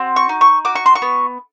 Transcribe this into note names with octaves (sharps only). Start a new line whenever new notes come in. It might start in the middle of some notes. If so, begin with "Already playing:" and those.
Already playing: C4 F#4
C#6
D#4
C#6
F#4 D6
C#6
C6
C#6
B3